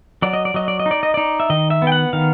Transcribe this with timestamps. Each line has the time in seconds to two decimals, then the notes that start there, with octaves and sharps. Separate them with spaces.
0.22 F#3 D5
0.33 D#5
0.45 D5
0.54 F#3 D#5
0.68 D5
0.80 D#5
0.86 D#4
0.91 D5
1.03 D#5
1.14 D#4 D5
1.40 E5
1.50 D#3 D#5
1.70 E5
1.82 B3
1.87 G5
1.92 F#5
2.13 D#3 F5